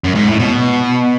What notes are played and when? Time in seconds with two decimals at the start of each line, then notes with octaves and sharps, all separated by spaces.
0.04 F#2
0.15 G#2
0.27 A2
0.39 B2